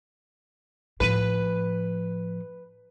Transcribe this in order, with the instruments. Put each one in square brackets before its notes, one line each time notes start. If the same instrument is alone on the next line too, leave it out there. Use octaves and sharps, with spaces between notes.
[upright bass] A2 F3 [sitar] B4